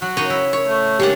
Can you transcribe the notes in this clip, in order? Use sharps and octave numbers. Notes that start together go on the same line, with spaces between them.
F#3 F#4
C#3 D#4 C#5 D#5
E4
C#5
A3
C#3 G#3 D4 G4 C#5 F#5